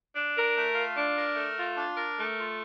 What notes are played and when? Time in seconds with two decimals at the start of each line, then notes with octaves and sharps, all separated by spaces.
0.14 D4
0.35 A#4
0.55 A3
0.75 F4
0.95 D4
1.16 A#4
1.36 A3
1.56 F4
1.76 D4
1.96 A#4
2.17 A3
2.37 F4